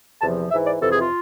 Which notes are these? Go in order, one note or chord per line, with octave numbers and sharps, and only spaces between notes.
E2 C3 F3 A5
G#2 E3 E5
D5
F2 C3 E3 A4
G#4
F4